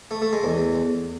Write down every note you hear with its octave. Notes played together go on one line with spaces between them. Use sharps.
A3
A3
G#3
E2